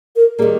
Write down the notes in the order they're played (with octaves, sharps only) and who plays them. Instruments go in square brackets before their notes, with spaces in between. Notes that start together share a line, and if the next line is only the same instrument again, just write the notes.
[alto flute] A#4
[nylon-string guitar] D#3 G3 A#3 [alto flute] G#4